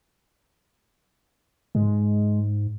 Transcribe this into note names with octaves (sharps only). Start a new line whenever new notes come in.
G#2 G#3